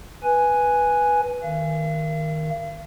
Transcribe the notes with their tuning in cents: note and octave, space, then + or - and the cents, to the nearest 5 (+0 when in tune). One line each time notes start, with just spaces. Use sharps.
B4 -5 G#5 +0
D#3 +0 F5 -45